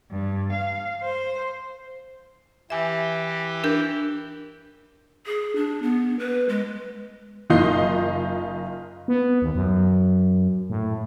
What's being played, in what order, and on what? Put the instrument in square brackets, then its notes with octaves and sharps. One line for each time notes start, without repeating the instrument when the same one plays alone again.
[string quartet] G2
F5
C5
[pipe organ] E3 G4 [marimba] E5 G#5
[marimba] D4 A#4 G6
[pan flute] G#4
D4
B3
B4
G#3
[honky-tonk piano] F#1 D#4 F4 D#5 G6 C7
[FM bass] B3
D#2
F#2
A2